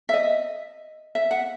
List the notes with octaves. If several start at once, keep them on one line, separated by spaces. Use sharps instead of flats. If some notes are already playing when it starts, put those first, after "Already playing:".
E5
D#5
E5
F#5